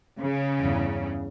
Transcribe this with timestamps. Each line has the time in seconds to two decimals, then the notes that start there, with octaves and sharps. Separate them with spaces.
0.19 C#3
0.58 E2 G2